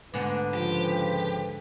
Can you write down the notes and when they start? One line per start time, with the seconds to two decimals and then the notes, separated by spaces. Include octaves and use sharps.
0.14 G#2 D3 B3 B4
0.54 C#3 F3 G4